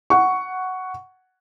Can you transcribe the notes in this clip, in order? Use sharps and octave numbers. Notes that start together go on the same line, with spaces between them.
F#5 C#6